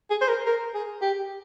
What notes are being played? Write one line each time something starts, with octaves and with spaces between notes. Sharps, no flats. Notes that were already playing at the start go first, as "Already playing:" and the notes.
G#4
C5
A#4
A#4
G#4
G4